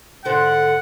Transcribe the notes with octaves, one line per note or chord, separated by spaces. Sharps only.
G#2 D3 C5 F#5